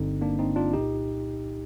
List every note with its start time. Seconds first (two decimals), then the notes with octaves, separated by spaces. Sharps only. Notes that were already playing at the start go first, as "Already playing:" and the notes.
Already playing: G1 G2 D3 C4 D#4
0.21 A#3 D4
0.39 C4 D#4
0.56 D4 F4
0.73 C2 A#2 D#4 G4